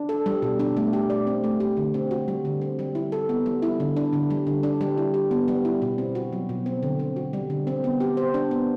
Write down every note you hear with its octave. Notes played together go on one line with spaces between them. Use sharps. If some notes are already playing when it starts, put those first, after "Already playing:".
Already playing: D4
A4
G3
B2
D4
A3
G4
D5
C4
A3
G4
D3
C4
F#4
G3
D3
C4
G3
E4
A4
B3
G3
E4
D3
D4
D3
G3
D3
D4
G3
E4
G4
B3
G3
E4
B2
C4
F#4
F#3
B2
C4
D3
C4
F#4
G3
D3
C4
B3
G4
C5
D4
B3